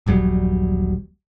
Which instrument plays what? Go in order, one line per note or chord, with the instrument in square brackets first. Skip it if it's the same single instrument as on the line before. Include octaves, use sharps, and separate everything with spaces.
[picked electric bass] D#1 A#1 F#3 G3